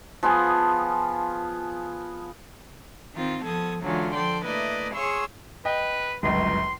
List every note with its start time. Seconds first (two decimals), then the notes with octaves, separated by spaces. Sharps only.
0.23 F3 B3 F4 G#4
3.14 D#3 C4 F4
3.44 F3 B3 A4 D#6 G#6
3.82 D3 E3 F#3 G#3 C#4 F4
4.13 F3 A4 D5 G5 C6
4.44 A3 A#3 E4 B4 D5 D#5
4.93 G#4 C#5 F5 C6 C#6 E6
5.65 B4 D#5 G5
6.23 G1 C#2 F#2 C6